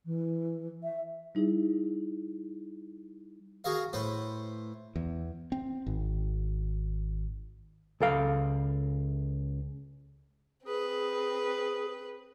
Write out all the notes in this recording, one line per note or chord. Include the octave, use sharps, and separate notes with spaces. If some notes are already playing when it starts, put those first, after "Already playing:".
E3
E5
G3 D#4 E4 G#4
F#4 G#4 A#4 F5
A2 B4 C5
E2
C4
G#1
C#2 A4 F5
C4 G#4 B4